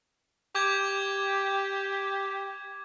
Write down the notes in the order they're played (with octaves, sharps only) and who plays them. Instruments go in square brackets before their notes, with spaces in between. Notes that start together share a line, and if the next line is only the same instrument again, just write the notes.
[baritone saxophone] G4 [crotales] D6 G#6